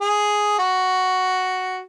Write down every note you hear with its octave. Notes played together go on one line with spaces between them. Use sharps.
G#4
F#4